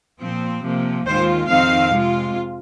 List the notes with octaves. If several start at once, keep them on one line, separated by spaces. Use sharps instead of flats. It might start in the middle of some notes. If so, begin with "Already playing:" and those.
A#2 F3 C4
C3 F3 A#3
D#2 D#3 G#3 F4 C5
F2 D#3 C4 D#4 F5
C3 G#3 F4